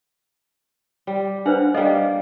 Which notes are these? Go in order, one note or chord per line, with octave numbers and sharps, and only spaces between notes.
G3
D4 B4 C5 F#5
G3 A#3 A4 D#5